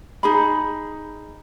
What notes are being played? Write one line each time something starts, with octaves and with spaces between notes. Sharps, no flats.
D#4 G#4 B5